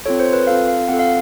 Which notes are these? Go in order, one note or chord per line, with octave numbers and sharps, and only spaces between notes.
C4 F4 A4 C#5
C5
B4
C4 F4 A4 F5
F5
C4 F4 A4 F#5
F5